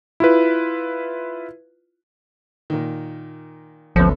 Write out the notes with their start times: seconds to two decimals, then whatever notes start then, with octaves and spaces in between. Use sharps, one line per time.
0.20 E4 F4 B4
2.70 A#2 D#3
3.96 G#1 D2 F3 B3 C#4 A4